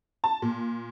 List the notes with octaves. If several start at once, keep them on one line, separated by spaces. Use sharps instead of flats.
A5
A#2